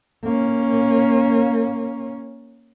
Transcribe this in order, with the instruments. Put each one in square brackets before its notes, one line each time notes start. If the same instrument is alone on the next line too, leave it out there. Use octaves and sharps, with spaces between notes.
[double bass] A#3 C#4